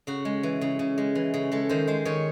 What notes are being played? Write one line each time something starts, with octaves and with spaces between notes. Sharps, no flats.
C#3 F#4
G#3
E3
C#3
C#3
G#3
E3
C#3
G#3 A4
D#3 C5
G#3 C5
D#3 C#5